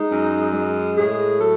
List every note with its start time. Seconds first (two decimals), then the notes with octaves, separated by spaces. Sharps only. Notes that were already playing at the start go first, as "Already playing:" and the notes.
Already playing: G#3 D#4
0.10 F#2
0.53 G#3
0.97 A2 G#4
1.39 F#3 A4